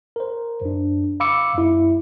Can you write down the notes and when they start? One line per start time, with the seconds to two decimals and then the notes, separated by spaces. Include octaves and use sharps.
0.16 A#4 C5
0.62 F#2 D4
1.20 F5 B5 D6 E6 C#7
1.55 F#2 E4